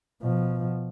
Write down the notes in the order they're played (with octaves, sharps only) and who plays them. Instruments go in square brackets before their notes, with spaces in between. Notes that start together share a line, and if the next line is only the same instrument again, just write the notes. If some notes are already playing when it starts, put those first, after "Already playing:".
[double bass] B2 F3